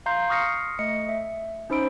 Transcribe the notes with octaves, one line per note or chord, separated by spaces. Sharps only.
F5 A#5 C6 G6 C7
C#6 D#6 F6 A#6 C7 C#7
A3 D#5 C#7
E5
C#4 D#4 C5 B5 E6 D7